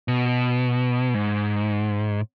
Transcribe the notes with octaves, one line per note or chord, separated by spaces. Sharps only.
B2
G#2